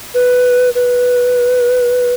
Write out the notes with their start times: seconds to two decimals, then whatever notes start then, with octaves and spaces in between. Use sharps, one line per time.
0.15 B4
0.75 B4